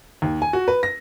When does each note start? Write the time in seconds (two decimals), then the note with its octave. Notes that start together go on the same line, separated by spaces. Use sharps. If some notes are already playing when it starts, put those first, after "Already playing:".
0.22 D#2
0.42 G#5
0.53 F#4
0.68 B4
0.83 A#6